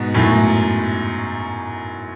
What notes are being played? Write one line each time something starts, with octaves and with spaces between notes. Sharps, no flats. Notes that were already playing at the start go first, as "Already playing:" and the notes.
Already playing: G#2 B2
F#2 A2